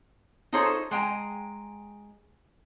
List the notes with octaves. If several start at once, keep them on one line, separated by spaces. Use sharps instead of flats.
D#4 F4 G#4 A4 C5 C#5
G#3 G5 G#5 A#5